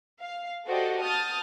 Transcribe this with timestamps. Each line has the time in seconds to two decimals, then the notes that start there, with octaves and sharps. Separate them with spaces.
0.20 F5
0.66 F#4 G4 A4 C5 D5 D#5
1.02 A5 D#6 F6 G6 A6